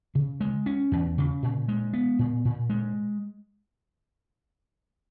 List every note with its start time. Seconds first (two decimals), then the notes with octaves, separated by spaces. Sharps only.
0.15 C#3
0.41 G#3
0.66 C#4
0.92 E2
1.18 C#3
1.43 A#2
1.68 G#3
1.93 B3
2.19 A#2
2.45 A#2
2.70 G#3